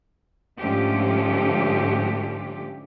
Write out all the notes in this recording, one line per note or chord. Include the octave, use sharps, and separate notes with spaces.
G#2 D3 F3 A3 C#4 G4